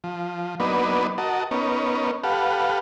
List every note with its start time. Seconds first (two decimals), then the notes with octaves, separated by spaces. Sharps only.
0.04 F3
0.60 F#3 A#3 B3 D4 D#4 B4
1.18 F#4 A#4 D#5 A5
1.51 B3 C#4 D#4 A#4
2.24 G4 A4 B4 F5 F#5